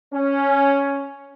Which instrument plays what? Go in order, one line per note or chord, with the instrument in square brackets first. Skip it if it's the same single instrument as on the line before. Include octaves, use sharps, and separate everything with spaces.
[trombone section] C#4